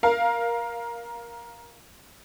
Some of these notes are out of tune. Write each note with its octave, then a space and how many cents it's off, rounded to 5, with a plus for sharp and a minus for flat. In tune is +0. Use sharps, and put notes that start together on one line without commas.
A#4 +15 F5 +0